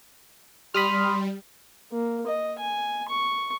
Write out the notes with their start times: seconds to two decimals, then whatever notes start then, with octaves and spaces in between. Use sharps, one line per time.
0.74 G3 B5 C6 D#6 F6
1.92 A#3
2.27 D#5
2.59 G#5
3.09 C#6